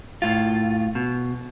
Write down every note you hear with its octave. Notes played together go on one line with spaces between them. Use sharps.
A2 F4
B2